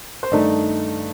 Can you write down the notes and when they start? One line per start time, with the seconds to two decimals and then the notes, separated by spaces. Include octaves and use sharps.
0.23 C5
0.31 G2 D#3 A3 D#4 D5